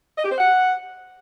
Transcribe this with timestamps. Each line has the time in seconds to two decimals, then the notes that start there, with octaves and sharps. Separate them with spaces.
0.17 D#5
0.24 G4
0.31 C5
0.38 F#5